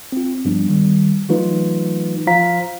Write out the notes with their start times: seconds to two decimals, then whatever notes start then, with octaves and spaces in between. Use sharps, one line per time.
0.12 C4 F4
0.45 G2 F3 G3 B3 D4
0.69 D#3 G3
1.29 E3 F#3 A3 D#4 F4 B4
2.27 F3 F4 C5 F5 A#5 B6